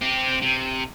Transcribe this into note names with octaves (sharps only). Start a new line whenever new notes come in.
C4 G4
C3